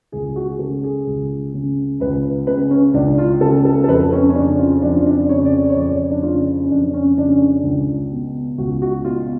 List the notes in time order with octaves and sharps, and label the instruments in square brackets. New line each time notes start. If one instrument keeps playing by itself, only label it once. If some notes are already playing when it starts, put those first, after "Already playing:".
[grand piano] C#2 G#4
F#4
G#4
C#3 A4
G#4
C#2
C#3
C#2 B4
C#3 B4
C#4
C#2 D4
F4
C#3 A4
A4
A4
F2 B4
C#4
C#4
C#3 D4
F4
F2 D4
F4
D4
C#3 C#5
D5
C#5
C#5
F2 D5
D4
C#3 F4
C#4
F2 D4
C#4
C#3 D4
C#4
D4
C#2
B2
C#2 F#4
F#4
B2 F4